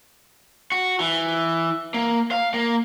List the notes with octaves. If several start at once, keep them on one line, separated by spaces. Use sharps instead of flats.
F#4
E3
A#3
F5
A#3